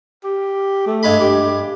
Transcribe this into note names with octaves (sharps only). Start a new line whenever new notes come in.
G4
A3
G2 G#3 B5
G4